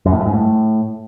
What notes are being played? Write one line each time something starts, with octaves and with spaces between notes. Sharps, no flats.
F#2
A2
G2
G#2
A2